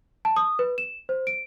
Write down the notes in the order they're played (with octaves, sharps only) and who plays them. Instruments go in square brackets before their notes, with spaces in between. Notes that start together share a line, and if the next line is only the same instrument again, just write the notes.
[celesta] A5
D#6
B4
E7
C5
D7